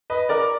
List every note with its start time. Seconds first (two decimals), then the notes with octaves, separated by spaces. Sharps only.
0.10 B4 D#5
0.29 A#4 D5